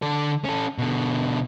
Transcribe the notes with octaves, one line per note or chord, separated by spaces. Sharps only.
D3 A4
C#4 A4
B2 D3